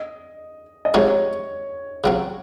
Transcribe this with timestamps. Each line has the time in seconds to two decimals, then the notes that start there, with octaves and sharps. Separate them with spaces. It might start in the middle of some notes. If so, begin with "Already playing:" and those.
Already playing: D#5
0.85 D#5
0.94 C3 F3 G#3 D#4 F#4 C#5
2.04 C#3 F#3 C4 F#4